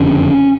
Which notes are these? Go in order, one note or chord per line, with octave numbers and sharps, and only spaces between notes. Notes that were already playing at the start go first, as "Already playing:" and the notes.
Already playing: F#1 F2 D3 C#4